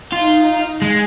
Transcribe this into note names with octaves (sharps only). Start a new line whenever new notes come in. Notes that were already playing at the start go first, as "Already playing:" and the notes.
D#4 F4
G#3